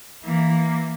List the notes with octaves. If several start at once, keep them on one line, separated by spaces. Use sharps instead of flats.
E3 A#3